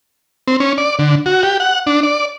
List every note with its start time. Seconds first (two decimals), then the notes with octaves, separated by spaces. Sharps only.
0.48 C4
0.60 C#4
0.78 D5
0.99 D3
1.26 F#4
1.43 G4
1.60 F#5
1.87 D4
2.03 D5